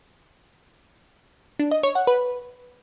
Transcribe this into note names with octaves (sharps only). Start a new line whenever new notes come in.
D4
D#5
C#5
F#5
B4